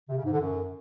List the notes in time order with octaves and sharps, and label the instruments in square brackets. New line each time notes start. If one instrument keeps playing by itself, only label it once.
[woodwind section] C3
C#3
G#2
D3
F#2